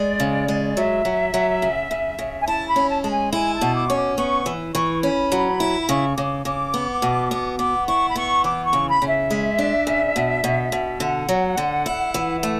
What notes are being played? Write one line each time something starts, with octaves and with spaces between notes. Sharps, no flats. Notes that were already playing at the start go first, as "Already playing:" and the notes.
Already playing: G#3 D5
C#3
G#3
F#3 E5
F#3
F#3
C#3
C#3
C#3
G#5
E4 A5
B5
C#4
A5
G#3 A5
G#5
E4 G#5
A5
B2
D6
C#4 C#6
D6
B3 C#6
E3
E3 C#6
C#4 B5
F#3
E4
B5
C#3 C#6
C#3 D6
C#3 D6
B3
B2
B3
B3 D6
E4 C#6
B5
B3 C#6
E3 D6
C#6
C#3
B5
C#3
E5
G#3
D4
C#3
B2
B2
B2
D3 F#5
F#3
D3
E4
E3
A3